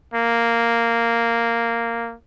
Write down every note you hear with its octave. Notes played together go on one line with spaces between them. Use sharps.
A#3